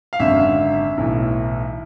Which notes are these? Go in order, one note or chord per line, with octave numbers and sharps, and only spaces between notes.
F5
G#1 F#2 D3 E5
B1 A2 E3